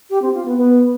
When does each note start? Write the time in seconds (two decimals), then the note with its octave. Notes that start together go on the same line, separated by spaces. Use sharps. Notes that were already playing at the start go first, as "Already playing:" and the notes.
0.10 G4
0.22 C4
0.34 F4
0.46 B3
0.57 B3